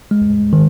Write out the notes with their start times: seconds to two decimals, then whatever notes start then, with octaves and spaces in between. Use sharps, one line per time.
0.11 G#3
0.53 D#3